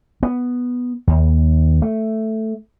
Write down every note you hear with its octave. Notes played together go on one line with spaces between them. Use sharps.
B3
D#2
A3